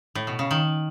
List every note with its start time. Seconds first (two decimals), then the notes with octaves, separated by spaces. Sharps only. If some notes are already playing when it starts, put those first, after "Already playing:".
0.15 A2
0.27 B2
0.39 C#3
0.51 D#3